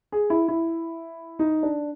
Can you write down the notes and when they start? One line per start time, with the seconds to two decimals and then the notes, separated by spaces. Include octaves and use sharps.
0.12 G#4
0.30 E4
0.48 E4
1.39 D#4
1.63 D4